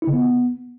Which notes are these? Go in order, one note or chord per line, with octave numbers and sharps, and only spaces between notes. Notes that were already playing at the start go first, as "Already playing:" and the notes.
E4
C#3
B3